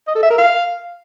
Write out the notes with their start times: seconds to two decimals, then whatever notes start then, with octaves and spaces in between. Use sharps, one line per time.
0.08 D#5
0.15 A4
0.23 E5
0.30 A#4
0.38 F5